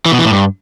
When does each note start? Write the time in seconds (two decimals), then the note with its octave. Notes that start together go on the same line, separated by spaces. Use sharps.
0.06 E3
0.12 B2
0.18 E3
0.25 A2
0.31 G2